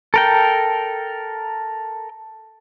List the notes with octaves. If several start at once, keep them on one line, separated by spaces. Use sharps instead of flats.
A4 A#4 G5